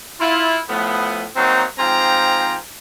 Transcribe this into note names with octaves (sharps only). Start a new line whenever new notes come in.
E4 F4
A2 F3 A3 B3
F#3 A#3 C4 C#4 D#4
G#2 F3 C4 F4 G5 A#5